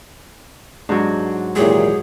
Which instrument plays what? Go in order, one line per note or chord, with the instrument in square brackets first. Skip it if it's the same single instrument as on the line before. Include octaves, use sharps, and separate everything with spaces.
[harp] G#2 F#3 [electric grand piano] D4
[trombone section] D#2 A#2 E3 [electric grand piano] G#3 G4 C#5 [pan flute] G#4